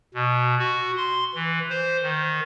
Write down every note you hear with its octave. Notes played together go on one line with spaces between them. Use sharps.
B2
F#4
C6
E3
C5
D#3